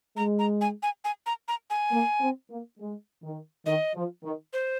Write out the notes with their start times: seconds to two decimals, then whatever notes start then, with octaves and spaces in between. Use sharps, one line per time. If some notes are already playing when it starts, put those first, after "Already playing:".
0.17 G#3 A#5
0.39 A#5
0.61 G#5
0.83 G#5
1.04 G#5
1.26 A#5
1.48 A#5
1.70 G#5
1.91 A#3
2.21 C4
2.50 A#3
2.78 G#3
3.23 D#3
3.66 D#3 D#5
3.95 F3
4.24 D#3
4.53 C5